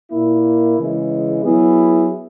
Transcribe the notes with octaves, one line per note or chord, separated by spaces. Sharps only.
A#2 A#3 E4
C#3 E3 G#3
F#3 B3 E4 G#4